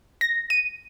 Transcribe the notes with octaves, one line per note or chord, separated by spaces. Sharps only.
A#6
D#7